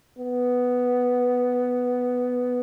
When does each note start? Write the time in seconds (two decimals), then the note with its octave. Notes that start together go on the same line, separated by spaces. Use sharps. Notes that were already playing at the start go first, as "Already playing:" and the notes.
0.19 B3